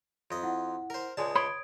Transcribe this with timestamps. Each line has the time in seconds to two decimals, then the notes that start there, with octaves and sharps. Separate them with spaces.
0.31 F2 D#5
0.43 E4 F#5
0.90 A#4 C5
1.17 C#2 G#3 D5 G#5 A5 D#6
1.36 C#5 B5 C6 D#6 G#6 D7